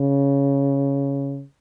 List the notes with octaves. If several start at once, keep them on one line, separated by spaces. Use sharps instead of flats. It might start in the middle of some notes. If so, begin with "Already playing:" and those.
Already playing: C#3